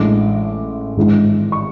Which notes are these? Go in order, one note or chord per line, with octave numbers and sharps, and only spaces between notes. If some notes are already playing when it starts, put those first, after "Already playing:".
Already playing: A1 A2 G#3 D4 D6
G#1 G#2 E3 G#3 D4
C#6